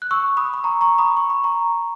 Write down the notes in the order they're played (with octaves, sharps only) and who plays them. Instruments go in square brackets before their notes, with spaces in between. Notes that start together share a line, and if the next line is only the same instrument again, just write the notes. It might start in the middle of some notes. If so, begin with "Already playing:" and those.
[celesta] F#6
C#6 E6
B5 D#6
B5
A#5 C#6
A#5 C#6
B5 D#6
C#6
B5
A#5 C#6